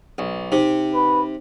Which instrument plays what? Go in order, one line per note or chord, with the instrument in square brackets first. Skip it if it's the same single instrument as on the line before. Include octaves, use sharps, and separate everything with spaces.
[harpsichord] B1
[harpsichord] C3 [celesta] D#4
[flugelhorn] B4